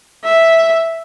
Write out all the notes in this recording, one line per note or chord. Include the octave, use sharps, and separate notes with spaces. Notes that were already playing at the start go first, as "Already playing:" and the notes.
E5